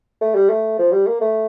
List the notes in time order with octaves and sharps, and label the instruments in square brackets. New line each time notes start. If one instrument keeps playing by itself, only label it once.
[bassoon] A3
G3
A3
F3
G3
A#3
A3